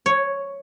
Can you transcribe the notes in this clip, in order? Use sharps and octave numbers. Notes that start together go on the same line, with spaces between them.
C#5